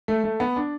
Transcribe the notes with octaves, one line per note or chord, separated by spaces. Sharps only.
A3
A3
B3
D4